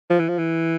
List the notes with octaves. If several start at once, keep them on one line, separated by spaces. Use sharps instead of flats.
F3
E3
F3
E3